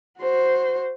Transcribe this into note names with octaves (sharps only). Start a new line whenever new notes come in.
F#4 C5